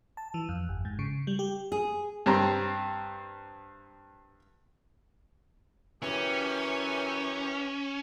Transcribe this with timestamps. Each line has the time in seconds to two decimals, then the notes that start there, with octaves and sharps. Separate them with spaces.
0.17 A5
0.34 E3
0.49 F2
0.69 G1
0.85 G#2
0.99 C#3
1.27 G3
1.39 G4
1.72 G#4
2.26 G2 C4 A#5
6.03 F#2 E3 C#4 G4